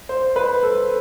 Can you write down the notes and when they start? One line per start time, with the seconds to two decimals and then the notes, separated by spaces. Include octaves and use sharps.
0.09 C5
0.36 B4
0.63 A4